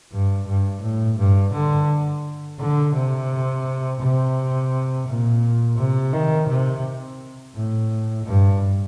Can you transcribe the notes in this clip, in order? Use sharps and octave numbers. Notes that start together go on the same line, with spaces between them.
G2
G2
A2
G2
D3
D3
C3
C3
A#2
C3
D#3
C3
A2
G2